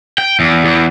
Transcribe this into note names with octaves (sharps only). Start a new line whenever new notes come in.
G5
E2
E2